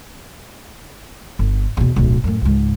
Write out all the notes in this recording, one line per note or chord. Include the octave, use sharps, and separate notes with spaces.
G1
E2 B2
D1 B1
F#2 A2
C#2 G#2